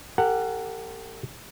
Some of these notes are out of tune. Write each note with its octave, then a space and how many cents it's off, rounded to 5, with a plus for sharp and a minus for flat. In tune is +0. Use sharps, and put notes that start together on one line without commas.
G4 +20 A#4 -45 F#5 +0